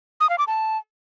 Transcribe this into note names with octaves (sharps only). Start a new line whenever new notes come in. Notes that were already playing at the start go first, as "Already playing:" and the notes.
D#6
F5
D6
A5